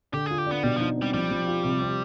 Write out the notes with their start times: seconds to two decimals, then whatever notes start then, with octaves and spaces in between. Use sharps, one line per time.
0.13 D3 G4
0.26 F4 G#4
0.38 G4
0.46 B3 D4
0.63 B2 G3
0.76 F3 D#4
0.97 G3 C4
1.14 F3 G3
1.31 F3
1.47 F4
1.64 C3
1.82 C4